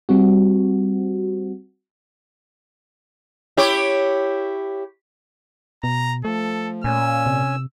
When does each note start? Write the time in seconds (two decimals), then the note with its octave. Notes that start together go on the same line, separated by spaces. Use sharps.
0.09 G3 C4 F#4
3.57 E4 G4 C#5
5.84 B2 A#5
6.25 F3 A3 A4
6.84 A#2 C#4 G#5 E6
7.26 C3